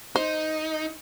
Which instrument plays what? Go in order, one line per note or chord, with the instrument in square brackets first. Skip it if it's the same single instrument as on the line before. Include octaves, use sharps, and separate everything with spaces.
[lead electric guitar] D#4 [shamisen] C5